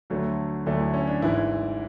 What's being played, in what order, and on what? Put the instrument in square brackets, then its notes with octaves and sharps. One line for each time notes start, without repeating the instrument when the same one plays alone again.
[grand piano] D2 D3 F#3 A3
D2 D3 F#3 A3 D4
E4
C#4
D4
G#1 G#2 E3 E4